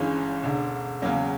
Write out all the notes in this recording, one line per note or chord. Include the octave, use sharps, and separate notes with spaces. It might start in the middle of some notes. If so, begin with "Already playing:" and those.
Already playing: G1 G2 E3 G#3 C#4
E1 D2 D3
E2 C#3 F#3 A#3 C#4